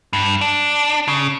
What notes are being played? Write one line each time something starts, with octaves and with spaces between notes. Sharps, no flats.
G2
D4
C#3